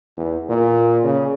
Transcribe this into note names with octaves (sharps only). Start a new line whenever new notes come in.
E2
A#2
C#3